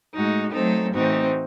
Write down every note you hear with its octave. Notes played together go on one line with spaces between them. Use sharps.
A2 G#3 D#4 F#4
F#3 A3 C4 D#4 A4
A2 E3 C4 D#4 F#4